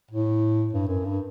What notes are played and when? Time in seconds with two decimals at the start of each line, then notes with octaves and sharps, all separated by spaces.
0.11 A2
0.73 G2
0.88 F#2
1.04 G2